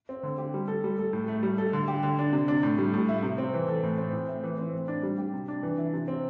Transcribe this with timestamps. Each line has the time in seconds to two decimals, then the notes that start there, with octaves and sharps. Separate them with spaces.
0.09 C4
0.23 D3
0.38 G4
0.54 G3
0.68 A4
0.84 G3
0.99 A4
1.13 A2
1.28 A3
1.43 G3
1.58 A4
1.73 D3
1.88 G4
2.03 D3
2.19 D4
2.33 C3
2.48 D4
2.63 A2
2.78 G3
2.94 A2
3.09 E4
3.23 C3
3.38 C4
3.54 E3
3.68 A4
3.83 A2
3.98 C4
4.13 A2
4.28 E4
4.44 E3
4.58 C4
4.73 A2
4.88 D4
5.03 G3
5.18 G4
5.33 C3
5.48 D4
5.63 E3
5.78 E4
5.93 C3
6.08 C4